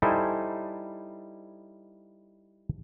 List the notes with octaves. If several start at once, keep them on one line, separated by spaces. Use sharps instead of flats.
G3 D#4 E4 A4 C5 G#5